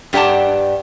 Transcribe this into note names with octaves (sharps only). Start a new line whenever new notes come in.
G2 G4 D5 F#5 A5